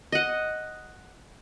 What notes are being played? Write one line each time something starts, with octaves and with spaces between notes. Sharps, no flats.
D#5 F#5